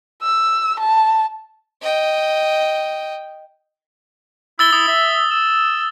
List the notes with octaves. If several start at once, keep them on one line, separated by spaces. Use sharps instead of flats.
E6
A5
D#5 G5
E4 E6 A6 G7
E4 D#6
E5
E6